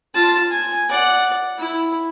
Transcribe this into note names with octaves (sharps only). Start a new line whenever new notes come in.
F4 A5
G#5
D5 F#5
E4